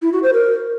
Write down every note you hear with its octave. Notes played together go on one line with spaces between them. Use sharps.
E4
F#4
C5
A#4